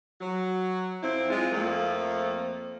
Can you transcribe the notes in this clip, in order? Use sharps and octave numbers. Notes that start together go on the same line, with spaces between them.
F#3
F2 C4 E4
G#3 F4
F2 F3 A3 A#3